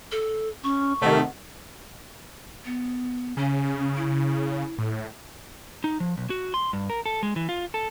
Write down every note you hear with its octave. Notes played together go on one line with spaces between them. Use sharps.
A4
C#4 C#6
C3 D#3 A3 F#5
B3
C#3 C#4
E4
A2
D#4
F3
B1
F#4
C6
G2
A#4
A4
G#3
E3
F4
A4